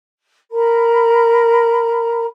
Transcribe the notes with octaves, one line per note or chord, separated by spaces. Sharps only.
A#4 A#5 B5